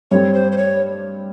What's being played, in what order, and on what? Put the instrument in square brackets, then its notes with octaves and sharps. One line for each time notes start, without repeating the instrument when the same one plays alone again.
[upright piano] G2 G3 C4 [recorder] C#5
[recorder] C5
C5
C#5